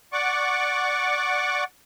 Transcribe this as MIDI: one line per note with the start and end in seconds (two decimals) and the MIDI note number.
0.13 1.64 74
0.13 1.64 78
0.13 1.64 85
0.13 1.64 86